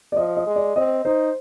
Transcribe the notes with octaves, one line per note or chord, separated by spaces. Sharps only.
D5
F3 D#5
D#5
G#3
D5
C4 D#5
D#4 C5